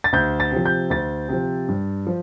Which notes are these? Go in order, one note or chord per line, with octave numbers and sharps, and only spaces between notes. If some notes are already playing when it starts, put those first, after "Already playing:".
A6
D2 G6
A6
C3 F3
G6
D2 A6
C3 F3
G2
F3